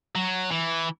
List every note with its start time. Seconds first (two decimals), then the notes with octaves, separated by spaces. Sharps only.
0.15 F#3
0.51 E3